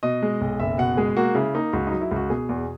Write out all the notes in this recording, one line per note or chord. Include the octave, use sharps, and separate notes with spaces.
B2 D#5
G#3
B1
F#1 E5
B2 F#5
G#3 G#4
A#3 F#4
C#3 E4
A#3 D#4
C#2 F#4
F#3 D#4
E4
C#2
F#4
B2 G#4
E2